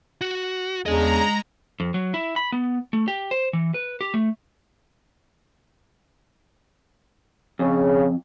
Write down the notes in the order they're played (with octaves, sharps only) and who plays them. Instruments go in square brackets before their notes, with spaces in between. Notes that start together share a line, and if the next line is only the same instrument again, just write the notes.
[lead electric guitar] F#4
[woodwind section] E2 [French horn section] C#3 D4 G#4 [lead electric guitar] G#3 D#5 [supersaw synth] A#5
[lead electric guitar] F2
F#3
E4
B5
B3
A3
G4
C5
E3
B4
G4
A3
[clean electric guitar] F2 [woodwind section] C#3